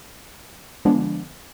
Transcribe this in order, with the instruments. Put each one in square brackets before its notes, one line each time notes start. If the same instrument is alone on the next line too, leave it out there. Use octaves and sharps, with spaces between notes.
[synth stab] D3 F3 G#3 B3 D4